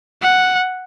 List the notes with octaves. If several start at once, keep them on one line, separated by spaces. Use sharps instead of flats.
F#5